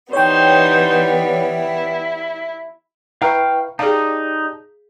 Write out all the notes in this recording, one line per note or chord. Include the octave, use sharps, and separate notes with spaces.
E3 G3 B3 D#4 C5 C#5 G5
E4
E4 B4 F5 G5 A#5 C#6 F6
D#4 G4 G#4 D5 F5 A5